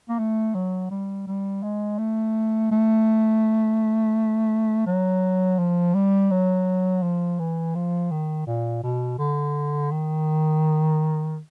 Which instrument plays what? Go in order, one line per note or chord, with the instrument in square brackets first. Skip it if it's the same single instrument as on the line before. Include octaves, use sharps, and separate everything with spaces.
[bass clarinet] A#3
A3
F#3
G3
G3
G#3
A3
A3
F#3
F3
G3
F#3
F3
E3
F3
D#3
A#2
B2
D3
D#3